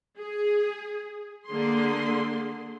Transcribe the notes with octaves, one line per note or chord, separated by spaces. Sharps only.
G#4
D3 A#3 G#4 C6